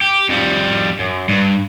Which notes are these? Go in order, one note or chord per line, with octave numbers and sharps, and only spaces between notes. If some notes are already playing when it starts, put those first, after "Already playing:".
G4
F2 G3
F#2
G2